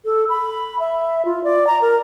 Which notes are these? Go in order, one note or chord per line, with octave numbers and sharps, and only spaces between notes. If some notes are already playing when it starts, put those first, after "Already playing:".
A4
B5
E5
F4
D5
A#5
A#4